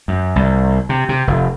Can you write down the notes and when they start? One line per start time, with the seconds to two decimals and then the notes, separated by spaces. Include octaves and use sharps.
0.08 F#2
0.36 C2
0.89 C3
1.09 C3
1.27 F1